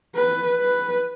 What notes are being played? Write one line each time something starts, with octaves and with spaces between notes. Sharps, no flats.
B4
B4